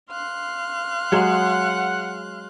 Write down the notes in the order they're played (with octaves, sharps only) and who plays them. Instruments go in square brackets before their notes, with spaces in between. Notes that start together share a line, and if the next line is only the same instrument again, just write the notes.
[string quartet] F5 C6 F#6
[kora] F#3 G#3 G#4 [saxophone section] F#5